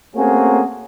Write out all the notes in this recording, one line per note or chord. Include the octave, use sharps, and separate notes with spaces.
A3 A#3 C4 C#4 F#4 G#4